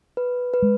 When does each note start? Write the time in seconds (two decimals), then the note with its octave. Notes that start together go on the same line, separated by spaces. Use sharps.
0.17 B4
0.54 B4
0.62 G#3